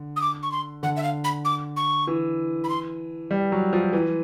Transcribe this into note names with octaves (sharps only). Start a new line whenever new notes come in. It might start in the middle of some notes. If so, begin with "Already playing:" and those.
Already playing: D3
D#6
D6
C#6
C6
D3 F#5
E5
F5
B5
D6
C#6
E3
B5
C6
G3
F#3
F3
E3